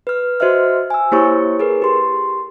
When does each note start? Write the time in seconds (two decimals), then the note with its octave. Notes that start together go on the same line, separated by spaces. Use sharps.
0.07 B4 F6
0.40 F#4 C5 D#5 E5 F6
0.90 G#5 E6
1.12 A#3 E4 G4 C5 C#5 C#6
1.59 G#4 A#4 B4
1.82 G4 C6